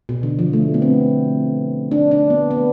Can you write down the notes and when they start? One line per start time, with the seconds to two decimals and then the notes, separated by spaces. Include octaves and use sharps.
0.09 B2
0.23 D3
0.39 F3
0.53 A3
0.74 B3
0.82 C4
1.92 D4
2.11 D4
2.30 B3
2.51 B3